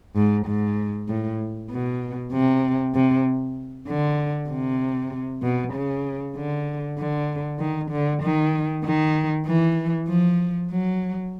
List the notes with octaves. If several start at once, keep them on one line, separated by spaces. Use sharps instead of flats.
G#2
G#2
A2
B2
C3
C3
D3
C3
B2
C#3
D3
D3
D#3
D3
D#3
D#3
E3
F3
F#3